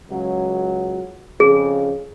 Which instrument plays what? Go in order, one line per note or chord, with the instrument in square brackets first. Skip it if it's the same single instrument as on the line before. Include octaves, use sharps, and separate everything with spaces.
[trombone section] C#2 F#3
[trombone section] F2 C#3 [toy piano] G#4